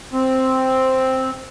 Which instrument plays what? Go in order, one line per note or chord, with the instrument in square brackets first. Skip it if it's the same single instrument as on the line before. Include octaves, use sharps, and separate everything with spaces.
[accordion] C4